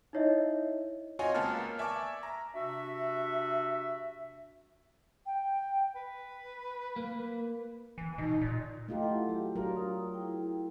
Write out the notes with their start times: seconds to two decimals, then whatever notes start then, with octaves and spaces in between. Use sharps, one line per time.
0.13 D#4 E4 C#5 D#5 E5
1.19 C4 F4 F#4 C#5 D#5 G#5
1.34 C#2 A#3 B3 A5 F6
1.79 D5 E5 G#5 A5 C#6 D6
2.23 A#5
2.54 C3 D4 F#4 E5
5.26 G5
5.95 B4
6.96 A#3
7.98 E3
8.18 B2 D#4
8.41 A#2
8.88 A3 F4 G4 A4 D#5 A#5
9.02 E4 A4 F#5
9.29 F#3 G4
9.56 F#3 D4 F4 A#4 D5
9.76 D#6
10.14 E4 G#4 G5